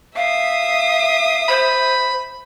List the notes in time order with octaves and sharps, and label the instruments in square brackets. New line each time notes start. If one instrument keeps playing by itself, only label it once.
[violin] E5 D#6 [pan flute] F5
[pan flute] C5 [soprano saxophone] B5